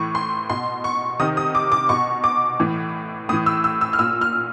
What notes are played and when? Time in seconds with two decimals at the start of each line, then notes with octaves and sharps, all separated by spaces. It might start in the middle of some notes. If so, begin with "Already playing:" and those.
Already playing: A2 E3 C#6
0.15 C6
0.50 B2 C6
0.84 C#6
1.19 C3 D#3 D#6
1.37 D#6
1.55 D6
1.72 D6
1.89 B2 C#6
2.24 D6
2.60 A2 E3
3.29 A2 D#6
3.33 E3
3.46 E6
3.64 E6
3.81 E6
3.93 F6
3.99 A#2 E6
4.21 F6